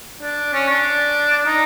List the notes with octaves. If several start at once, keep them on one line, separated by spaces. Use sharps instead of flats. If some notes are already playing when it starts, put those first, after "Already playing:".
D4
C#4
D4
D#4